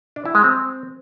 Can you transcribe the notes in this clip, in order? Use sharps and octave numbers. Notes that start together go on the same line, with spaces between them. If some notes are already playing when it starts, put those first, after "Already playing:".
D4
E4
G#3
C4